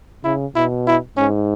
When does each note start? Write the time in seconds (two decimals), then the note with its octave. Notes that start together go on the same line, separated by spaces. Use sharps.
0.24 C#3 E4
0.55 B2 E4
0.87 E4
1.17 G#2 C#4